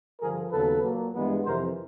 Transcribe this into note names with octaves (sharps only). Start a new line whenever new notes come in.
G2 D3 F3 G#4 A#4
D#2 C#3 F#3 B3 A4 B4
A#2 F#3 A#3
G2 E3 G#3 B3
F2 C3 E3 A#4 C5